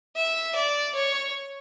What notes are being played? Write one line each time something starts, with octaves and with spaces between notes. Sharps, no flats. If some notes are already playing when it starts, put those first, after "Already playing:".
E5
D5
C#5